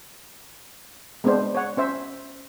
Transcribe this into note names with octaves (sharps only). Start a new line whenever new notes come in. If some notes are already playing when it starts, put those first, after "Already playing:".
G#3 B3 C4 D4 C5
C#5 F#5
C#4 C5 E5